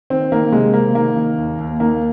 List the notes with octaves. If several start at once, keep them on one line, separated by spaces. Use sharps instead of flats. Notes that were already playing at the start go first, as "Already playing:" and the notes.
D#3 C4
D#3 A#3
C3 G#3
C3 A#3
D#3 A#3
D#3
D#2
D#2
D#3 A#3